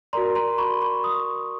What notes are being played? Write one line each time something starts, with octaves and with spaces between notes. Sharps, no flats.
F#4 A#4 D5 A#5 C6
A#5 C6
B5 C#6
B5 C#6
C#6 D#6